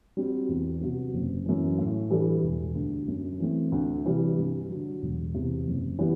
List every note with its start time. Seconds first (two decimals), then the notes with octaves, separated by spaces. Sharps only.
0.17 G3 C4 F#4
0.49 E2
0.81 C3 F#3 B3
1.14 F#1
1.46 F#2 E3
1.78 A2
2.10 E3 G3 D4 A4
2.43 E1
2.75 D2 D3
3.08 F#2
3.40 E3 A3 C4
3.72 D2
4.05 C3 E3 G3 D4
4.37 G2
4.70 D3 F#3
5.02 E1
5.34 E2 C3
5.67 F#1
5.99 E3 G3 B3